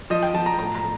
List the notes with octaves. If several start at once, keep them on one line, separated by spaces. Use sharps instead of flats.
F3 D#5
G5
F3 A5
A#5
A2 A#5
A#5
A2